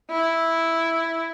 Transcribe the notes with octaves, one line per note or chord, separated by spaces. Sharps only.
E4